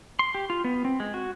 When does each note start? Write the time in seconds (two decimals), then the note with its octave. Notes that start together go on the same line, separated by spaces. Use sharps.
0.19 C6
0.35 G4
0.50 F4
0.64 B3
0.85 C4
1.00 G#3
1.14 F#4